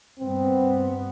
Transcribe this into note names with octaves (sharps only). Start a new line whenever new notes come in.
G2 B3 C4